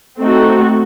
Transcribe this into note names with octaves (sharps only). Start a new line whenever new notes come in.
A3 C4 D#4 F#4 A4